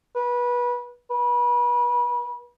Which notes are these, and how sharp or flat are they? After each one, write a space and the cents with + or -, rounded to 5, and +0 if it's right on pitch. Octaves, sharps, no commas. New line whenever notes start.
B4 -25
B4 -30